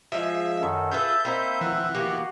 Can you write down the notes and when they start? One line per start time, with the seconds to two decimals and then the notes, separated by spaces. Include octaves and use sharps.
0.12 F3 G#3 F4 E5
0.61 F#2 D#3 A4
0.91 F4 G#4 A4 B4 E5 G6
1.25 A#3 C4 D#4 C5 E5 B5
1.61 E3 F#5
1.94 A#3 B3 F#4 G4